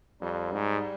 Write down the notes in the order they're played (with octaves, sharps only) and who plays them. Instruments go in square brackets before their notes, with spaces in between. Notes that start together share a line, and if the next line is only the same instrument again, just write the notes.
[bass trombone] F2 [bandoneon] G3
[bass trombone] G#2